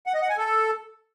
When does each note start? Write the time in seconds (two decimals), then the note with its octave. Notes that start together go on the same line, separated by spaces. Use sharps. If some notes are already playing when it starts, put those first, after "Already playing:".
0.06 F#5
0.14 D#5
0.22 F#5
0.30 G#5
0.37 A4